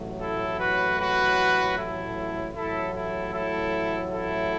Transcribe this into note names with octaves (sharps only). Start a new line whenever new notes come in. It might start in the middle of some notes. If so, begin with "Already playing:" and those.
Already playing: A1 A2 F#3
E4 A4
F#4 B4
F#4 B4
E4 A4
A1 A2 F#3 E4 A4
E4 A4
E4 A4
E4 A4